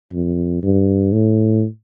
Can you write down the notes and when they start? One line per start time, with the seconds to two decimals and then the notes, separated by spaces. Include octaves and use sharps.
0.13 F2
0.63 G2
1.13 A2